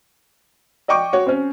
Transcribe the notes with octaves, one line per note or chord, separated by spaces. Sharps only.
D5 D#5 G5 C#6 D6
F#4 C#5
C4 C#4